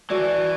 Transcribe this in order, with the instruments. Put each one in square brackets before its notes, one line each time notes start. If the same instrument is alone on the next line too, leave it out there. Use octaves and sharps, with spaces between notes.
[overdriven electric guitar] E3 [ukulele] F#4 A4 D5